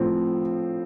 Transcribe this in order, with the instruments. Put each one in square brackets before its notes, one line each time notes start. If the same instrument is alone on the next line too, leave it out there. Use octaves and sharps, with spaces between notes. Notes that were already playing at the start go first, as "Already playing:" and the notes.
Already playing: [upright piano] A2 F3 C4